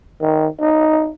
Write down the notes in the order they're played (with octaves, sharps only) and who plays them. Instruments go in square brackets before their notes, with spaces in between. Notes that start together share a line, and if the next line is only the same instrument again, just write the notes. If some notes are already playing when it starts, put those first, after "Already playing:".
[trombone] D#3
D#4